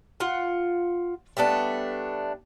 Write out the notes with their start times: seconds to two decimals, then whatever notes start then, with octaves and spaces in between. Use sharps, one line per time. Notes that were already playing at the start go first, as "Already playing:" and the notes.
0.20 F4 F#5
1.37 G3 A3 B3 D4